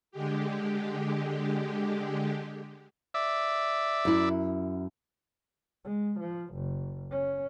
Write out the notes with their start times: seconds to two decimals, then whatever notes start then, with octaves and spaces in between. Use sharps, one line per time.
0.11 D3 G#3 G4
3.14 D5 E5
4.05 F#2 E4
5.85 G#3
6.20 F3
6.54 F#1
7.11 C#4